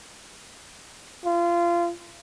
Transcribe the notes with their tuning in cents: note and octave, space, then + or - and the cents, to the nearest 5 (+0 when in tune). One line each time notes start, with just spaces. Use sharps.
F4 -25